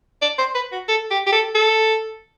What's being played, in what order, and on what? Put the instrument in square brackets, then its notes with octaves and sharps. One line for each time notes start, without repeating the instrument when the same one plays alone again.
[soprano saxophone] D5
C5
B4
F#4
A4
G4
G4
A4
A4